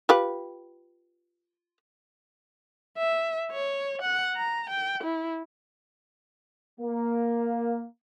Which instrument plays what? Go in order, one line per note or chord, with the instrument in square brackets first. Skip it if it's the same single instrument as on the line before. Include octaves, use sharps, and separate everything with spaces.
[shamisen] F4 G4 B4
[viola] E5
C#5
F#5
A#5
G5
E4
[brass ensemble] A#3